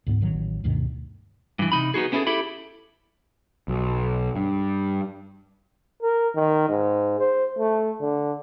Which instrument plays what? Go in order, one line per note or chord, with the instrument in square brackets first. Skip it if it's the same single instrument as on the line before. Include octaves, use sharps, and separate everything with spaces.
[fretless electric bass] D2 G#2 A#3 B3
A1 D#3 F#3
D2 G2 B2 D#3
[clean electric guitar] G2 E3
C3 D#4 B5
B3 D#4 F#4 G#4
B3 C#4 E4 F4 G#4 A4
E4 G4 A4 E5 B5
[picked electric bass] B1
G2
[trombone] A#4
D#3
G#2
C5
A3
D3